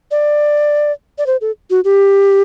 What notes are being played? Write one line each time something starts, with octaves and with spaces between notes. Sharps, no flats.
D5
D5
C5
A4
F#4
G4